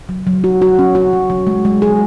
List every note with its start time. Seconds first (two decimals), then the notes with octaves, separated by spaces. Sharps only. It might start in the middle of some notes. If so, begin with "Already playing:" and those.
0.09 F#3
0.27 F#3
0.44 F#4
0.62 F#4
0.79 C#4
0.95 F#4
1.13 F#3
1.30 F#3
1.47 G#3
1.65 G#3
1.82 G#4